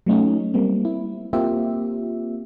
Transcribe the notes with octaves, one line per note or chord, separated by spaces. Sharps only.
F#3 A3 C#4 D#4
G3 A#3 C4
E4
A#3 C4 F4 G4 E5